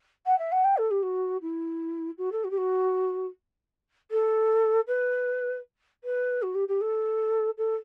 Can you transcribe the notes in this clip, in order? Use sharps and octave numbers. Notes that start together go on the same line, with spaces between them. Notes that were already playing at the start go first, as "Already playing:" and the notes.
F#5
E5
F#5
G5
A4
G4
F#4
E4
F#4
A4
F#4
G4
F#4
A4
B4
B4
F#4
G4
G4
A4
A4